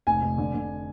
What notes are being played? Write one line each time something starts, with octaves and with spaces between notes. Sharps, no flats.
F1 G#5
F1
D3
D3